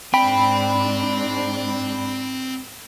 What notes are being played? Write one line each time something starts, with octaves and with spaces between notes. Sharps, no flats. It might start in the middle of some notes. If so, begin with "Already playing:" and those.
G#2 C4 D4 G5 B5